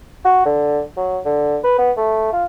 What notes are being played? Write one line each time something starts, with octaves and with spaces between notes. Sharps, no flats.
F#4
D3
F#3
D3
B4
B3
A3
F4